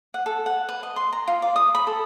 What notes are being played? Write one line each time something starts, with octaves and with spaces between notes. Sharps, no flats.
F#5
A4
F#5
B4
D#5
C6
A#5
F4
D5
D#6
B5
A4